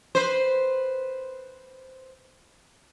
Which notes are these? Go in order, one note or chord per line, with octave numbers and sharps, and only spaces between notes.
B4 C5